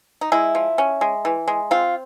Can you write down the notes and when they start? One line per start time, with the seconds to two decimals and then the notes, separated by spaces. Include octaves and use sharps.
0.21 D#4
0.32 G#3 E4
0.55 F3
0.78 C#4
1.01 G#3
1.25 E3
1.48 G#3
1.71 C4 F4